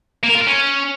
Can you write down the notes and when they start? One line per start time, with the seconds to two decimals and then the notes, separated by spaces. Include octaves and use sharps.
0.23 A#3
0.29 A#4
0.35 F4
0.41 A#4
0.46 C#4